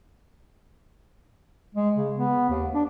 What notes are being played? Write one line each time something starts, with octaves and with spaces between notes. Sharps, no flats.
G#3
C#3
B3
D#2
D4